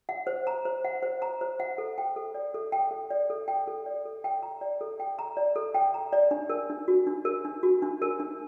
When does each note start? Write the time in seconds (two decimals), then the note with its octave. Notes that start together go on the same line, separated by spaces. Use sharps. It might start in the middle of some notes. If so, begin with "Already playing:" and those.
0.09 F#5
0.27 C5
0.47 A#5
0.65 C5
0.85 F#5
1.03 C5
1.22 A#5
1.41 C5
1.60 F#5
1.78 A4
1.98 G5
2.16 A4
2.35 D5
2.54 A4
2.72 G5
2.91 A4
3.11 D5
3.30 A4
3.48 G5
3.67 A4
3.86 D5
4.05 A4
4.24 G5
4.42 A#5
4.61 D5
4.81 A4
5.00 G5
5.19 A#5
5.37 D5
5.56 A4
5.74 G5
5.94 A#5
6.13 D5
6.31 D4
6.50 A#4
6.70 D4
6.88 F#4
7.07 D4
7.25 A#4
7.45 D4
7.63 F#4
7.82 D4
8.02 A#4
8.20 D4